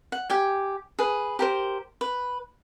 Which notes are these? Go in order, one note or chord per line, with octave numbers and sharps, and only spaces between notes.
F#5
G4 G5 G#5
G#4 B4
G4 A#4 C5
B4